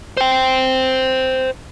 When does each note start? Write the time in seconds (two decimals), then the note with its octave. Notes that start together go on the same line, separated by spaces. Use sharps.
0.17 C5 G5